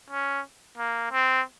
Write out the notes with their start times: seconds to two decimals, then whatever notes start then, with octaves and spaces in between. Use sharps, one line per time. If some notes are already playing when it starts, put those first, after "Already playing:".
0.11 C#4
0.78 A#3
1.12 C4